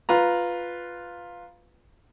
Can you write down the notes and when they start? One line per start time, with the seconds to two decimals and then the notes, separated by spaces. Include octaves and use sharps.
0.09 F4 B4 A#5